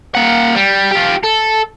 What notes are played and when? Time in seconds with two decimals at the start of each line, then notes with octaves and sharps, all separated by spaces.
0.15 A#3 F#5
0.55 G3
0.92 F4 G4
1.24 A4